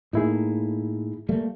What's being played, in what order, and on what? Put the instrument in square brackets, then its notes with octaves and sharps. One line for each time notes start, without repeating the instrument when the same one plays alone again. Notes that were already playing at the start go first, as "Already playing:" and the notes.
[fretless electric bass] A2 A#3 [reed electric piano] D#4 E4 G#4
[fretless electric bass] G3 A3 A#3